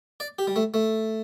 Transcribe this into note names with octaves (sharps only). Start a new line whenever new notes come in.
D5
G4
G3
A3
A3